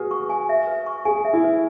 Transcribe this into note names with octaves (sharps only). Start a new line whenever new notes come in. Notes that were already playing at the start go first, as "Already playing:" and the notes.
Already playing: F#4 G#4 B4
C#6
G#5
E5
B4
C#6
G#4 G#5
E5
E4
B4